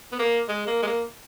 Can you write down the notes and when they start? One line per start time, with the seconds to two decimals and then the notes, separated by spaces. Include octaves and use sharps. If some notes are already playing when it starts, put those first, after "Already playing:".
0.12 B3
0.19 A#3
0.49 G#3
0.67 A#3
0.83 G#3
0.87 A#3